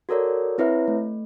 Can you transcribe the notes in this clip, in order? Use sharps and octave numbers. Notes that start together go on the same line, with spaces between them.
F#4 A4 A#4 C#5 D5
C4 E4 B4 C#5 E5
A3